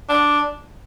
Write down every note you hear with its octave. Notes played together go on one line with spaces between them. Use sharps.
D4